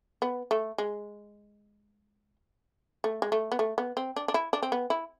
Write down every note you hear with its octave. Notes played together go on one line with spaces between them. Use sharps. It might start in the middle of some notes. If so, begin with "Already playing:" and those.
B3
A3
G#3
A3
G#3
A3
B3
A3
B3
C4
D4
D4
E4
D4
C4
B3
E4